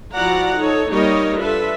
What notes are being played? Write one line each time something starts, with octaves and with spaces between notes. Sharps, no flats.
F3 E4 F#4 D5 F#5 A#5
D#4 A4 C#5
G3 A#3 D#4 A#4 C#5 D#5
D4 F4 A4 B4 E5